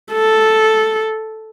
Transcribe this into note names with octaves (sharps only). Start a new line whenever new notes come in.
A4